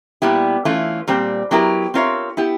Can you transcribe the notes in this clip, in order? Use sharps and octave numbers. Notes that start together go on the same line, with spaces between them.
A#2 G3 B3 E4 G4
E3 A3 C#4 F4
A#2 G3 C4
F#3 B3 E4 G4 A#4
C4 F4 A#4 C#5 E5
B3 E4 G4